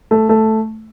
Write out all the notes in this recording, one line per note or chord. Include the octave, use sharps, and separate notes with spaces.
A3
A3